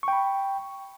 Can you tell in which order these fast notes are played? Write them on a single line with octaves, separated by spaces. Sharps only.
C#6 G5 B5